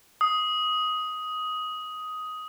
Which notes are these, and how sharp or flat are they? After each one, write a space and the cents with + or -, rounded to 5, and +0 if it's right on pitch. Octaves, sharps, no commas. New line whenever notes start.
D#6 +10